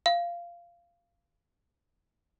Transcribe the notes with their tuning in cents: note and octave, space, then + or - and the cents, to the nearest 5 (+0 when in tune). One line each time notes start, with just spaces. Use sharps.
F5 -15